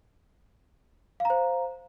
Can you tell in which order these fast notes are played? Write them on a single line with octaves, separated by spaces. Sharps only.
F5 A#5 C5